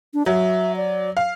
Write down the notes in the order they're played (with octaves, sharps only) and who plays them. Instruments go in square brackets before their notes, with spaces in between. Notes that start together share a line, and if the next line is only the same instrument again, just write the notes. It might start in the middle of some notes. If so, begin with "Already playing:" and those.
[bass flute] D4
[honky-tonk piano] F#3 [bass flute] E5
[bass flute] D5
[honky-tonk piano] F5